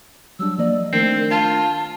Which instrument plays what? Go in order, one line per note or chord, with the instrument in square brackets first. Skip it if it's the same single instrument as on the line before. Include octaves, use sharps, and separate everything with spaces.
[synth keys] F#3 G3 D4 [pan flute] E6
[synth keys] F3 A#3 D#5 [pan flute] D5
[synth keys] D#3 A3 D4 [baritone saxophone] C4 [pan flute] A#4
[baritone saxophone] F4 [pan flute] A5